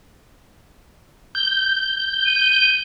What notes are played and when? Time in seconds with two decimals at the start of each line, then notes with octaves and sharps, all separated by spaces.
1.35 G6
2.26 D#7